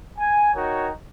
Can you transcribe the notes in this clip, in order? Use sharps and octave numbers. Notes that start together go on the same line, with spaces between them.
G#5
D#4 F#4 A#4 C#5 G5